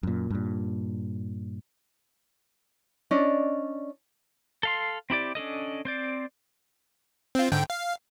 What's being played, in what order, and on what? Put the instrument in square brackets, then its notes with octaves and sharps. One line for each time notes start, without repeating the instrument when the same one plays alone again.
[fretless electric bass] F#2 A#2
G2 A#2
[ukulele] C#4 D4 D5 D#5
[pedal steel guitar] A4 F5 C6
C4 E4 G4 D5
C#4 D4 A4 D#5
C4 C5 D5
[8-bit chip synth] C4 F4
G#2 D3 G5
F5